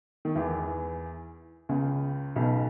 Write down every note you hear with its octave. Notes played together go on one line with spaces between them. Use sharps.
D#3
E2 E3
C#2 C#3
B1 B2